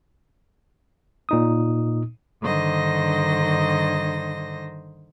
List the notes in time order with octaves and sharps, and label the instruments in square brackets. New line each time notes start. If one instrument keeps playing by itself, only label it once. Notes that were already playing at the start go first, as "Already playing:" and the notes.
[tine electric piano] A#2 D#4 D#6
[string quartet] G2 D3 D#3 C5 D#5 A#6